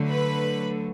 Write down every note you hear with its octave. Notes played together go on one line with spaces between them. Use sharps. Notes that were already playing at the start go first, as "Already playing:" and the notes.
Already playing: D3 F#3 A3
B4 B5